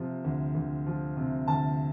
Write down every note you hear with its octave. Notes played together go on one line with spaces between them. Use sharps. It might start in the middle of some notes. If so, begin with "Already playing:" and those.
Already playing: C3 F3
D2
D2
F3
C3
D2 A5